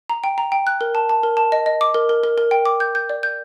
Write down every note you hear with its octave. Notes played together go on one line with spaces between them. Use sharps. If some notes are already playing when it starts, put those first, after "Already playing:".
A#5
G5
A#5
G5
F#6
A#4
A5
A5
A#4
A5
D#5
D#5
D6
A#4
A#4
A#4
A#4
G5
D6
G6
G6
D5
G6